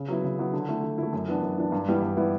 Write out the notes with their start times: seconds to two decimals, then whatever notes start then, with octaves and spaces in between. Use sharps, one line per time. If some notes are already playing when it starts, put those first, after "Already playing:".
Already playing: C#3
0.08 F#3 B3 E4
0.24 C#3
0.39 F#3 B3 E4
0.53 D3
0.69 A3 E4
0.84 D3
0.98 E4
1.03 A3
1.13 F#2
1.28 E3 B3 D4
1.42 F#2
1.58 E3 B3 D4
1.72 G2
1.88 E3 G3 B3 E4
2.02 G2
2.17 E3 G3 B3 E4